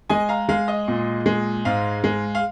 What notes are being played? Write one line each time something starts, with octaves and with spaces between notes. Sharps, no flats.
G#3 D#5 G#5
F5 A#5
G#3 F5
D#5
A#2
G#3
G#2 F5
G#3
F5